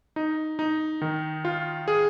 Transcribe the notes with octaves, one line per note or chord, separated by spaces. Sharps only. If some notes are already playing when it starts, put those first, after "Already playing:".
D#4
D#4
D#3
F4
G#4